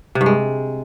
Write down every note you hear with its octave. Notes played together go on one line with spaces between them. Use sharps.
C3
G2
G#3